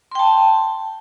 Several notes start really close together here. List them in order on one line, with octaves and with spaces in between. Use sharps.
C6 G5 A5